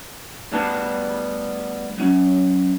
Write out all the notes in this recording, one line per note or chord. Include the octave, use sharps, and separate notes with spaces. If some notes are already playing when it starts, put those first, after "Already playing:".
D2 G3 B3 D4 A5
F#3 C#4